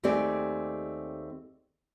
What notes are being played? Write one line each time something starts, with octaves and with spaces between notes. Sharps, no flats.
D#2 A3 C4 G4 G#4 D5